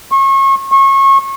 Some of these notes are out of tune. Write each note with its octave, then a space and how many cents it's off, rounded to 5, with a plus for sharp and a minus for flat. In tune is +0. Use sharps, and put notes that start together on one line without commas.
C#6 -35
C#6 -30